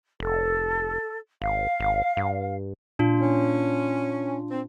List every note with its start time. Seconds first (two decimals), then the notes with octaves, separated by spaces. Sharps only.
0.20 F1 A4
1.42 G#1 F5
1.80 G#1
2.17 G2
2.99 A#2 D4 F4
3.21 C#4
4.51 C4